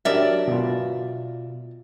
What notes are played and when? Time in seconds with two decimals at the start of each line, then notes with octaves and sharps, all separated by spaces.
0.05 F#3 D4 G4 A#4 D5 E5
0.48 B2 F4